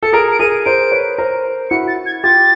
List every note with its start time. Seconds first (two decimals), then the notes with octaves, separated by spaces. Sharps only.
0.03 A4 C#7
0.13 G#4 A#4 D7
0.32 D7
0.39 G#4 A#4 D#7
0.65 A#4 C5 D7
0.92 B4 C#5
1.18 A#4 C5
1.70 E4 F#4 C#7
1.88 A6
2.06 G#6
2.24 F4 G4 A6